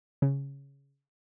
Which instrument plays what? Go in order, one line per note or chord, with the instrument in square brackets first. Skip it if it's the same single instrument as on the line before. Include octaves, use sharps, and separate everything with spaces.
[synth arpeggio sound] C#3